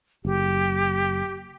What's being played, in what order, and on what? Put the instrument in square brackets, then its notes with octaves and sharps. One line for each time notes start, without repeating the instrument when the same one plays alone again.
[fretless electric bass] F#1 [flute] G4